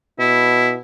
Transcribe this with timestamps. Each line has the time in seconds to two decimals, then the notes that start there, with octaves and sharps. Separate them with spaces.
0.19 B2 E4